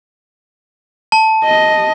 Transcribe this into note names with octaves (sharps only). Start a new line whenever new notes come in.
A5
D#5